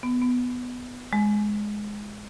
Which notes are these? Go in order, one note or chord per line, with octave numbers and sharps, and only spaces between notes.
B3
B3
G#3